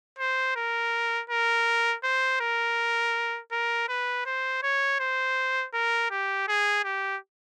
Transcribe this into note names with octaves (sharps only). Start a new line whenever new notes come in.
C5
A#4
A#4
C5
A#4
A#4
B4
C5
C#5
C5
A#4
G4
G#4
G4